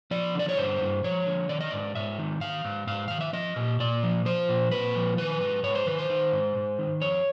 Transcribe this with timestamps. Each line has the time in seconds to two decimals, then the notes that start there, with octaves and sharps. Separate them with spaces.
0.11 F3 D5
0.35 D3 D5
0.49 C#5
0.57 G2 C5
0.81 G2
1.04 F3 C#5
1.27 D3
1.49 D#3 D5
1.61 D#5
1.71 G#2 D5
1.95 G#2 E5
2.18 D#3
2.41 D#3 F5
2.65 G#2
2.87 G#2 F5
3.08 D#3 F5
3.21 E5
3.33 F3 D#5
3.56 A#2
3.80 A#2 D5
4.03 F3
4.25 F3 C5
4.49 A#2
4.71 A#2 B4
4.95 F3
5.18 D#3 B4
5.41 G#2
5.63 G#2 C#5
5.75 C5
5.87 D#3 B4
5.98 C5
6.09 D#3
6.32 G#2
6.56 G#2
6.79 D#3
7.02 F2 C#5